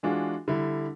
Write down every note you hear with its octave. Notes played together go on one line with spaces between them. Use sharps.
E3 G#3 D4 F4 F#4
D3 G3 E4